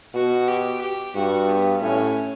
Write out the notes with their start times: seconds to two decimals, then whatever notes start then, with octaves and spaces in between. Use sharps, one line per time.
0.15 B2 F#4
0.48 G4
0.81 G4
1.16 G2 F#4
1.49 B3
1.82 A2 C#4